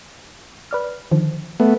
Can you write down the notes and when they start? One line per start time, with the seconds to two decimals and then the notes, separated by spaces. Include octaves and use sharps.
0.71 B4 D5 F6
1.11 D3 D#3 F3
1.60 A3 B3